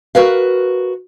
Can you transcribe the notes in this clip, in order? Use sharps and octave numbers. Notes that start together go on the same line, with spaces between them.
F#4 A#4 B4 F5